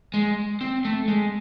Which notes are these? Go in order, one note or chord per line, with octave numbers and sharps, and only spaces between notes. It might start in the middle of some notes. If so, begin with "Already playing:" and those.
G#3
C4
A3
G#3